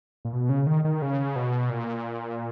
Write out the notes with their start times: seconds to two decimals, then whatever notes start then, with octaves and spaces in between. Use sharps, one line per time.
0.25 A#2
0.33 B2
0.49 C#3
0.67 D#3
0.85 D#3
1.02 C#3
1.36 B2
1.70 A#2